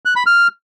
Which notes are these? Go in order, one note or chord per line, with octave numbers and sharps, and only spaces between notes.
F#6
B5
F6